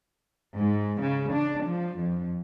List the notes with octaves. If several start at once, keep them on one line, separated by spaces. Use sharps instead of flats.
G#2
C#3
D4
F3
F2